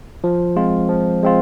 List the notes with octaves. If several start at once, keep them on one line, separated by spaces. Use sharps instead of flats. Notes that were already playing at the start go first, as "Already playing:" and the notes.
F3
G#3 C4 F4
F3
G#3 C4 F4